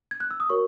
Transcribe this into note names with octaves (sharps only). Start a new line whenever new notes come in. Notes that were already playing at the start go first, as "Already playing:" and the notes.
G#6
F#6
E6
D#6
F#4 A#4 C#5 C#6